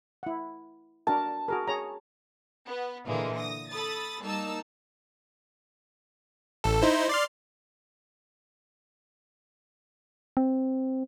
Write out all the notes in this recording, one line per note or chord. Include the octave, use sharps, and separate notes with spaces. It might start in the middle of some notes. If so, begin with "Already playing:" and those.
E4 F#5
D4 F#4 A#4 A5
F#4 G#4 A#4
G#4 C#5 A#5
B3
A#2 D3 E3 G#3 A#3
D#6 A#6
A4 B5 D#6 A6
G3 A#3 D#4 A5 E6
A1 A4
D#4 E4 C5
D5 C6 F6
C4